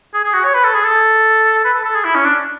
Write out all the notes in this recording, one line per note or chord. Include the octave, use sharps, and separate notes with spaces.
G#4
G#4
F#4
C#5
B4
A4
G#4
A4
B4
A4
A4
G#4
E4
C#4
D4